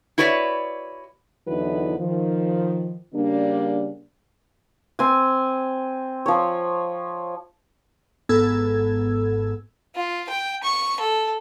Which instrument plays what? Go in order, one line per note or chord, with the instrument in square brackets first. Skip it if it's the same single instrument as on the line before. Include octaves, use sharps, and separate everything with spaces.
[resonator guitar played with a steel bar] E4 F#4 B4 C#5 D5
[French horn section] E2 D3 E3 F#3 D#4 B4
D#3 F3
C#3 G3 A#3 D4
[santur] C4 G#5
F3 C#5
[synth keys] G#1 G#2 B3 A4 E6 G#6
[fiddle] F4
G5
C#6
A4